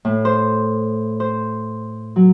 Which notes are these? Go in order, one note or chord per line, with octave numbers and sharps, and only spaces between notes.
A2
C5
C5
F#3